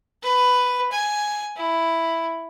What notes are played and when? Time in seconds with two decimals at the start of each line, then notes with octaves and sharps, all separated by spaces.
0.23 B4
0.91 G#5
1.56 E4